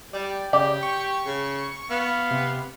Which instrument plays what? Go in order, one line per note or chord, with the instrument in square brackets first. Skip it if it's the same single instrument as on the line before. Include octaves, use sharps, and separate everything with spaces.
[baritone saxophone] G3 [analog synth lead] D5 [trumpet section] G5
[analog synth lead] C#3 [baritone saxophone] G4 [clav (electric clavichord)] D5
[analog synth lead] C#6
[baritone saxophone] C#3
[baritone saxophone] B3 [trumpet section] F5
[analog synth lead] C3